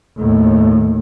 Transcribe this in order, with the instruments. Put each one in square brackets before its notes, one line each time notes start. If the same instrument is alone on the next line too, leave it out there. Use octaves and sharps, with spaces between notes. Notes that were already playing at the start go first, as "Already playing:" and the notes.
[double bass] D#2 A2